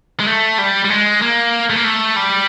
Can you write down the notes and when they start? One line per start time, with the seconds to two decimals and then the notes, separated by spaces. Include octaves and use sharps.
0.20 G#3
0.27 A3
0.58 G3
0.85 G3
0.90 G#3
1.22 A#3
1.70 A3
1.76 A#3
1.84 A3
2.16 G3